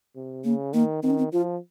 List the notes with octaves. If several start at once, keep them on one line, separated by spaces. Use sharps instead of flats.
C3
C#3 A#3
D#3 A#3
D#3 C4
C#4
C4
F3 F4